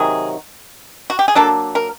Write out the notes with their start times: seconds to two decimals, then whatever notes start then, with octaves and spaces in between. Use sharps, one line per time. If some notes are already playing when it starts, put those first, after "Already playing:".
Already playing: C3 D#3 F#3 G#4
1.10 F#4
1.19 G4
1.28 G#4
1.35 F#3 A#3 D4 A4
1.75 A#4